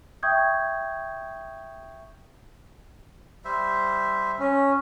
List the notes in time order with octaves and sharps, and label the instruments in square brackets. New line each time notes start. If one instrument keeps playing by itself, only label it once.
[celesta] E5 G5 C#6 D#6 G6 G#6
[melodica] G3 C5 E5
[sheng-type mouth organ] C#4